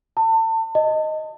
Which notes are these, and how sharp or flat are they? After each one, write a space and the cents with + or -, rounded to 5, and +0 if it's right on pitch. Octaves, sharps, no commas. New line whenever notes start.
A5 +35
D#5 +5